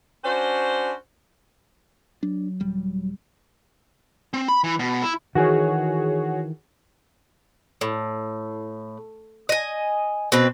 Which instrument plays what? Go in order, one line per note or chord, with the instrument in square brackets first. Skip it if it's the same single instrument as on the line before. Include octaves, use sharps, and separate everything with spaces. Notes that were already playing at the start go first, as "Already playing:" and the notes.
[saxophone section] C#4 D4 F#4 C5
[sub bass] F#3 [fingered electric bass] D4
[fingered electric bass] D#1 G3
[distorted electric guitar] C4
B5
E3
B2
E4
[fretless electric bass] D#3 E3 [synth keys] F#4 G#4 C#5
[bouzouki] A2
D#5 G#5
B2 C4 B4